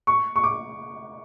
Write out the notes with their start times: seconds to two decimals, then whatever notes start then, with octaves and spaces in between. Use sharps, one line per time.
0.07 C#6
0.36 C#6
0.44 D6